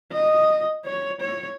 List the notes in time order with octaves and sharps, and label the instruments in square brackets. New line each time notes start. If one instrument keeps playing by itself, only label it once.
[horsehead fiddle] D#5
C#5
C#5